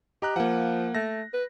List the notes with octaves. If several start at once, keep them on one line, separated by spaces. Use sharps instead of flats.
G4 D#5 A#5 F#6
F3 A#3 F#5
A3 A#6
B4